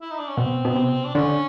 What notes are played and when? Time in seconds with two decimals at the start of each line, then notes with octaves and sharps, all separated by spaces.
0.01 E4
0.11 D#4
0.19 D4
0.28 C#4
0.37 B2 C4
0.65 B2
0.75 C3
1.05 D4
1.15 D3 C#4